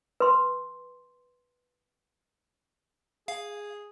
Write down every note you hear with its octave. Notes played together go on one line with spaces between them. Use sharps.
B4 C6
G#4 F5